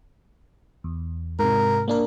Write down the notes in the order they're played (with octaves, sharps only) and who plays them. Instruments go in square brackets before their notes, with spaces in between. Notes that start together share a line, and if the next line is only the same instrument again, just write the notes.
[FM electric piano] E2
[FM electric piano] G#2 C3 [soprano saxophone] A#4
[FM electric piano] A#3 D4 A#4